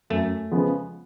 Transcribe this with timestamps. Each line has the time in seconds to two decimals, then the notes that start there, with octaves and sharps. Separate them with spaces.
0.10 F#2 A3
0.51 C#3 F3 G#3 B3